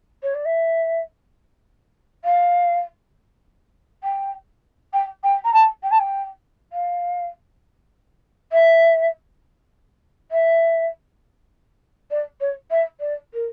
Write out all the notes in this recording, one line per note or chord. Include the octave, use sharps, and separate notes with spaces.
C#5
D5
E5
F5
G5
G5
G5
A#5
A5
G5
A5
G5
F5
E5
E5
D5
C#5
E5
D5
A#4